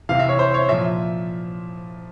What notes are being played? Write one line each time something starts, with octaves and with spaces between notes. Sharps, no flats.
C3 E3 F5
E5
C#5
C5
C#5
A#2 F3 E5